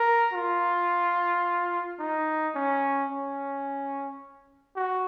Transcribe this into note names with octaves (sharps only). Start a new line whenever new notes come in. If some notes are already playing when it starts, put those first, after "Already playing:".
Already playing: A#4
F4
D#4
C#4
C#4
F#4